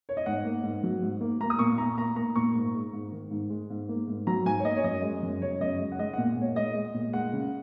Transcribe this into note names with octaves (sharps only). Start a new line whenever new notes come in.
C#5
D#5
G#2 F#5
A#3
G#2
F#3
G#2
A#3
A#3 A#5
D#6
A#2 C#6
A#2 A#5
A#3 A#5
A#3 A#5
A#2 C#6
G#2
G#3
G#2
D#3
G#2
G#3
G#2
A#3
G#2
F#3 A#5
G#2 G#5
C#5
A#3 D#5
C#5
F#2 D#5
G#3
F#2
C#3 C#5
F#2 D#5
G#3
F#5
G#3 D#5
A#2 F#5
A#2 C#5
G#3 D#5
G#3
A#2
G#3 F#5
C#3